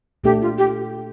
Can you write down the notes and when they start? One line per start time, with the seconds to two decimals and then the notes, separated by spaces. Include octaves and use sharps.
0.24 A#2 A3 D4 G4 A4
0.41 F4
0.58 G4